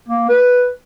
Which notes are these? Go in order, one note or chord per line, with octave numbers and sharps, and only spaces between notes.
A#3
B4